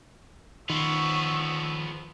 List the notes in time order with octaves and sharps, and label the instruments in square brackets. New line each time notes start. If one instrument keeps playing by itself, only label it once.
[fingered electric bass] D#3 [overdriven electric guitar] F3 B3 [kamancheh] C#6 E6